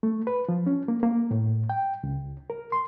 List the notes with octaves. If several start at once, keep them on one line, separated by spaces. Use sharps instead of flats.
A3
B4
F3
C#4
A#3
A#3
A2
G5
C#2
A#4
C6